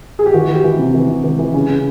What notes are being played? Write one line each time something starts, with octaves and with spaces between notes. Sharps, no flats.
G#4
G4
E3 F#4
E3
G4
E3
C3
E3
C3
E3
E3
C#3
C#3